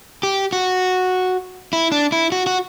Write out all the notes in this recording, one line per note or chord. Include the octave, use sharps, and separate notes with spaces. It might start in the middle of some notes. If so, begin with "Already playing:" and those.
G4
F#4
E4
D4
E4
F#4
F#4